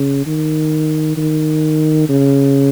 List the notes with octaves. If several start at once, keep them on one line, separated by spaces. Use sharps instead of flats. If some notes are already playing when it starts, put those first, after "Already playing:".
Already playing: C#3
D#3
D#3
C#3